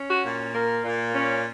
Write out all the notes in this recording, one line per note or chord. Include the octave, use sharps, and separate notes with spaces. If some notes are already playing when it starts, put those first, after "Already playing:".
Already playing: C#4
F#4
A#2
A#3 A#4
A#2
C#4